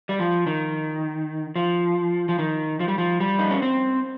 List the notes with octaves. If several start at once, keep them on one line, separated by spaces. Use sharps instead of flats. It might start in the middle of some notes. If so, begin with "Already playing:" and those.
G3
F3
D#3
F3
F3
D#3
F3
G3
F3
G3
D#4
C#4
C4